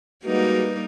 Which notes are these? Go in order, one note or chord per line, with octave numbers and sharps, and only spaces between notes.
G3 G#3 A#3 D#4 F#4 B4